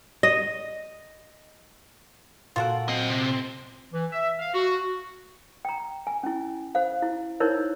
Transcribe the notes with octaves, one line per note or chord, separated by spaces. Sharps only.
D#5
A#2 F4 F#4 A4 F#5 D7
F#3 C4 D#5
C3
E3
E5
F5
F#4
G5 A#5
G#5
C#4 E4
C5 F5
E4
D#4 E4 A#4 C5 C#5